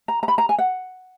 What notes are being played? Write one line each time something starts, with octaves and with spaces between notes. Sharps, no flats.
A#5
A#5
B5
A#5
G#5
F#5